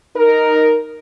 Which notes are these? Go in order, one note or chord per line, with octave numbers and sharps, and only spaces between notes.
D#4 A#4